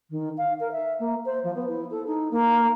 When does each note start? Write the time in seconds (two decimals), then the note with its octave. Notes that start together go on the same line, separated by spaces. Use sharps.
0.10 D#3
0.37 F5
0.59 A#4
0.71 E5
0.99 A#3
1.25 C5
1.43 F3
1.54 B3
1.68 E4
1.90 A4
2.06 D#4
2.31 A#3